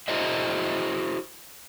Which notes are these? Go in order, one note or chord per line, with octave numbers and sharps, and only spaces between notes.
E4 F#4 G#4 C5 D#5 E5